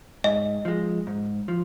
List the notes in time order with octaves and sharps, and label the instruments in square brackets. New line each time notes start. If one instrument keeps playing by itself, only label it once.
[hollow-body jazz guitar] G#2 [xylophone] D#5
[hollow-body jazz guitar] F3 G#3
G#2
F3